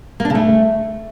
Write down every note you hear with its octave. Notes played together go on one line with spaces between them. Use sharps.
A#3
D4
C#3
A3